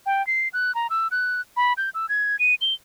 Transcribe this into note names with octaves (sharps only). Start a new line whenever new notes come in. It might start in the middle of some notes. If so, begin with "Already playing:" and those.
G5
C7
F#6
A#5
E6
F#6
B5
G6
E6
G#6
D#7
G7